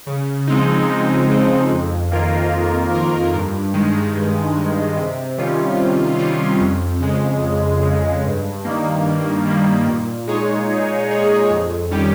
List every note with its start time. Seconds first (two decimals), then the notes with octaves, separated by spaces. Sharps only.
0.07 C#3
0.47 F3 G#3 C4 D#4
0.89 C#3
1.29 F3 G#3 C4 D#4
1.71 F2
2.11 D#3 A#3 F4 A#4
2.52 F2
2.93 D#3 A#3 F4 A#4
3.34 G2
3.74 D#3 G#3
4.16 G2
4.56 D#3 G#3
4.97 C3
5.38 D#3 G3 C#4 F4
5.78 C3
6.19 D#3 G3 C#4 F4
6.60 F2
7.00 C#3 G#3
7.42 F2
7.83 C#3 G#3
8.24 G2
8.65 D#3 G3 A#3
9.05 G2
9.46 D#3 G3 A#3
9.87 A#2
10.27 G#3 D#4 G#4 C#5
10.69 A#2
11.09 G#3 D#4 G#4 C#5
11.50 F2
11.91 D#3 G3 C#4 G4